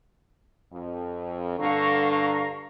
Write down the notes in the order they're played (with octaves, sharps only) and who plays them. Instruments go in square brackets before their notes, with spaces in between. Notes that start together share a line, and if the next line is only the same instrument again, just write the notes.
[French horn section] F2
[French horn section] G2 D3 [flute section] F5 A#5 C#6